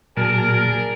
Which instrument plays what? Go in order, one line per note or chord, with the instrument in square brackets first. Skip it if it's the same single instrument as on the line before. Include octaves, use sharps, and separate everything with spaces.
[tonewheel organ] A#2 F#3 A5 [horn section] D4 G#4 A#4